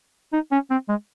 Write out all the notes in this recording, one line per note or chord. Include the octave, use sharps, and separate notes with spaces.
D#4
C#4
C4
G#3